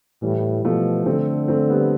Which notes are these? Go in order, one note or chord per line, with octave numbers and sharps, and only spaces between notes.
A2 E3 G3
B2 F3 A3
D3 A3 C4
A3 C4
G3 B3